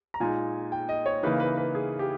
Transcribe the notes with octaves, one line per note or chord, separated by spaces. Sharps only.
A#5
A#2 G#3 D#4 G#5
G5
D#5
C#5
C#3 E3 A#3 D#4 B4
B4
B4
G#4
G4